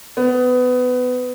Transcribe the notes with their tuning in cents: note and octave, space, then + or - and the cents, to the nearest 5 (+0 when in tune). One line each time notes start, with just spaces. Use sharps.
B3 +20